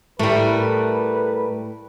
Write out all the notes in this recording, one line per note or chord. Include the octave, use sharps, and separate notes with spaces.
A2 G3 A3 A#4 B4